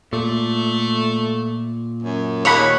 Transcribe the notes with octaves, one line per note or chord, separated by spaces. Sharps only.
A#2 A3
F#2
D#2 C#5 F#5 B5